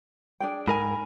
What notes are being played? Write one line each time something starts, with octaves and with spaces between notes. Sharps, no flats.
D4 G#4 G5
G#2 A#4 G#5 B5